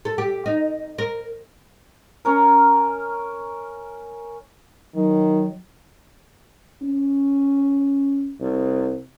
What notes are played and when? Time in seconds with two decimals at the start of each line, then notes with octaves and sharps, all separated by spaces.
0.05 A4
0.18 G4
0.46 D#4
0.98 A#4
2.25 C#4 A#4
4.95 D#3 F#3
6.82 C#4
8.40 C2